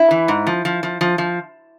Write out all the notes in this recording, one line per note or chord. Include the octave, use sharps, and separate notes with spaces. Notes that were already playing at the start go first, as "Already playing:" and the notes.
Already playing: E4
E3
G#2
F3
F3
F3
F3
F3